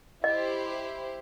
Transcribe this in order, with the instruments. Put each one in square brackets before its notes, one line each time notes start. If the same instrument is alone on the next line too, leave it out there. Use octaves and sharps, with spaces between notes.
[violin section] E4 G4 C5 [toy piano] D#5